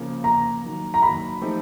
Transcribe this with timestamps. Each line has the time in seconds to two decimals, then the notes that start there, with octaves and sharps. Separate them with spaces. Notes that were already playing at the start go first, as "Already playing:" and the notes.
Already playing: C#3 F3 A#3
0.24 C#3 F3 A#3 A#5
0.63 D#3 F#3 A#3
0.94 A#5
1.02 D#3 F#3 A#3 B5
1.42 F3 A3 C4 D#4 G4